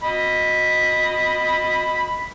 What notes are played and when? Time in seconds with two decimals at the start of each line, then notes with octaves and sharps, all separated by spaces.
0.03 D#5 B5